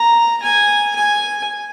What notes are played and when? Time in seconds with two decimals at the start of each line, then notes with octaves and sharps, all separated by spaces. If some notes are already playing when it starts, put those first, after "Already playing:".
Already playing: A#5
0.42 G#5
0.95 G#5